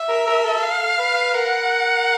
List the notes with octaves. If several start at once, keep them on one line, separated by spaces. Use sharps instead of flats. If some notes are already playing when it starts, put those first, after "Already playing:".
Already playing: E5
A#4
A#4
A4
F5
B4
A#4 F#5